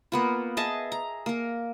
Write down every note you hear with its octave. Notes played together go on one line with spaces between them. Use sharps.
A#3 B3 F4
G#4 D#5 E5 A5
A#5
A#3 A#4